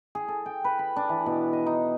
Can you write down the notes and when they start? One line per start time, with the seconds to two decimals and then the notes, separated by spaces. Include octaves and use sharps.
0.15 G#4
0.28 A4
0.46 G5
0.64 B4
0.79 B5
0.96 D4
1.09 E3
1.26 B2
1.53 D#5
1.66 D#4